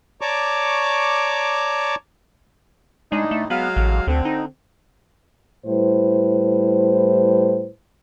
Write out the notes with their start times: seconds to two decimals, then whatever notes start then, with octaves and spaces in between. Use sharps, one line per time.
0.21 C#5 D5 A5 A#5 C#6 D6
3.12 A2 G#3 D4 D#4
3.31 A3
3.50 F#3 G#3 B3 F5
3.76 A1
4.07 D2 D3 C4
4.25 D#4
5.66 A2 G3 E4 B4 C5